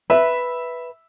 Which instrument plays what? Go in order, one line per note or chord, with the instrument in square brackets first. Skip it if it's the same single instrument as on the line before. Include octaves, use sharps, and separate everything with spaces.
[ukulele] B4 [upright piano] E5